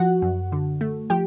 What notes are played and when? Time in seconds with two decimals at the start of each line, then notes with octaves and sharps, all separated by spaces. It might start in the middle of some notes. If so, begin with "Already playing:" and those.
Already playing: F3 F#4 F#5
0.22 F#2
0.52 D3
0.81 A3
1.10 F3 G4 G5